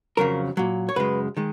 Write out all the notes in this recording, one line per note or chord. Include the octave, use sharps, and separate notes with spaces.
F2 C#3 F#3 A#4
A#2 F#3
C#5
F#2 C#3 G#3 B4
D#3 G#3